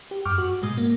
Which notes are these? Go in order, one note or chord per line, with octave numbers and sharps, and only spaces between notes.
G4
F#2 C#6 D6 F6
F#4
G#2 B2 G#3 D#6
A#3